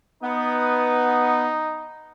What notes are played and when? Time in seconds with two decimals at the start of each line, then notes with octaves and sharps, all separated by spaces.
0.23 B3 D#4